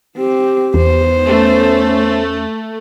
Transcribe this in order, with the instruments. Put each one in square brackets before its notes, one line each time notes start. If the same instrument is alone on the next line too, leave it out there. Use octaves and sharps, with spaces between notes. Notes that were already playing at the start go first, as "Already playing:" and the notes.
[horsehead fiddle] C4 [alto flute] G4
[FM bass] E2 [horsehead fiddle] B3 C5
[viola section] A3 [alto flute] C#4